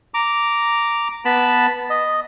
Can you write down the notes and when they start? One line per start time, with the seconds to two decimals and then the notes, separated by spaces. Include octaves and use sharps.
0.14 A#5 D6
1.25 B3 A5 B5
1.90 D#5